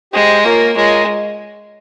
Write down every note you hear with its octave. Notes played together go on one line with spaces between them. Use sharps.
G#3 G4 C5 D#5
A#3 F4 A#4 C#5 G#5
G#3 F4 A#4 C#5 G#5